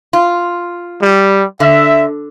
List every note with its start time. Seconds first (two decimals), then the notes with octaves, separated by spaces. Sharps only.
0.13 F4
1.00 G3
1.60 D3 E5